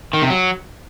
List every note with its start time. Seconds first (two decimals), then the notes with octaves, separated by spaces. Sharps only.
0.13 D#3
0.22 C3
0.30 F#3